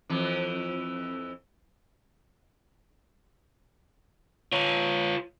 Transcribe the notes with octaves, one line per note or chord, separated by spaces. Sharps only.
F2 E3
F4 C#5